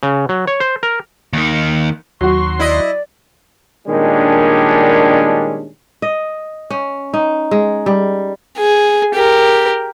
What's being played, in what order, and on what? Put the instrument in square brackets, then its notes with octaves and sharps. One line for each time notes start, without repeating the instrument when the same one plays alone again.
[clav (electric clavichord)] C#3
F#3
C#5
C5
A#4
[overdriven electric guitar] D#2 D#3
[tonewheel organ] D#2 C6 [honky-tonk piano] F#3 F#4 [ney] C#6
[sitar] E4 D#5 [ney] D5
[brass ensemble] A#2 D#3 G3 G#3 C#4 D4
[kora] D#5
C#4
D#4
G#3
G3
[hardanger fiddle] G#4
G4 A#4